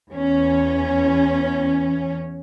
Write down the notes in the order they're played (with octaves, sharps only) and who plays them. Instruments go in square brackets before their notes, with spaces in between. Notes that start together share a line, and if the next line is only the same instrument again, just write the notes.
[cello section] E2 C#4